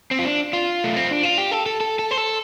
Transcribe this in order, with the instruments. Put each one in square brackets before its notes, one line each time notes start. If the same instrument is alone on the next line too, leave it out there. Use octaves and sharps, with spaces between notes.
[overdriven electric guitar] C4
F4
D4
F4
A3
C4
D4
F4
G4
A4
A4
A4
A4
C5
A4